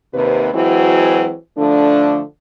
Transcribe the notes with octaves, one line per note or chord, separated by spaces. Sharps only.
D#2 C3 B4
E3 F#3 G#3 C4 E4 F#4
D3 F3 A3 D4